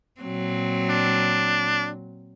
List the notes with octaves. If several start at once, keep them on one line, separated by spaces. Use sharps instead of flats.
A#2 F#3 C4
D4